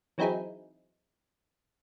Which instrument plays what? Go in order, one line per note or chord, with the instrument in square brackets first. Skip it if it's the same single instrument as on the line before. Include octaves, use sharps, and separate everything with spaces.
[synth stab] E3 F#3 C4 D#4 E4 G#4